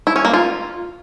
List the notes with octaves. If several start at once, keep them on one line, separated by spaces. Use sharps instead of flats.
E4
C#4
A#3
F4